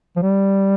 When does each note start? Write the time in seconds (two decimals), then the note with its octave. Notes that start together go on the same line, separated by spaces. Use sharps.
0.16 F3
0.22 G3